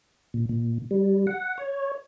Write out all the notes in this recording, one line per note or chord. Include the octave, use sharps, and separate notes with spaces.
A#2
A#2
G3
F#5
C#5